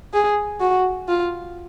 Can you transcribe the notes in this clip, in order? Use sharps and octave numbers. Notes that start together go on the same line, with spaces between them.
G#4
F#4
F4